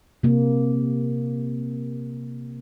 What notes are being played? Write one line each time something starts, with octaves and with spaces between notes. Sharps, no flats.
C3 A#3